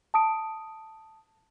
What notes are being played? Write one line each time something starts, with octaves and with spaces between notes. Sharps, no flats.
A5 D#6 D7